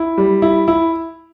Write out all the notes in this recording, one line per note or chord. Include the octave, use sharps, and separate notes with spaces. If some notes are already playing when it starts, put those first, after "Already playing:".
Already playing: E4
G3
E4
E4